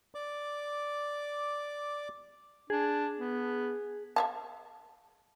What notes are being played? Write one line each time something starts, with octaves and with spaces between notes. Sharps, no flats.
D5 D6
D4 G#4
B3
E5 F5 A5